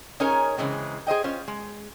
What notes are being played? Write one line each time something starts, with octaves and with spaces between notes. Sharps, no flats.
C#4 D#4 G#4 A#4 C#5 G#5
C#3 E3 G#3 C4
G#4 C5 D#5 G5
C#4 F4 C5
G#3